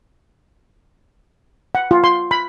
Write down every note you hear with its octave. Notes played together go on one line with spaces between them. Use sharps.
F#5
F4
C6
B5